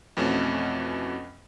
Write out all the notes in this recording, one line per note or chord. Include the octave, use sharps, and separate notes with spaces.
F2 B2 E3 A3 C#4